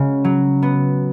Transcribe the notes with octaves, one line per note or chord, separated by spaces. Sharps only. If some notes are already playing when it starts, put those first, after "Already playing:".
Already playing: C#3 G#3 F#4 F#5
F#3
B3